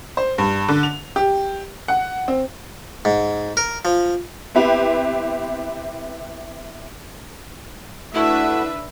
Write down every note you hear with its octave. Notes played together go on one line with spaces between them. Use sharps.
C5
G2
D3
F7
G4
F#5
C4
G#2
A#4
F3
B3 C4 E4 G4 B4
A3 D4 E4 F#4 B4 E5